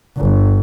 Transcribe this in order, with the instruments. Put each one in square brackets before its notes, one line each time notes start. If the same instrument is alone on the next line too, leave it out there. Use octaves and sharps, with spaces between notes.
[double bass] G1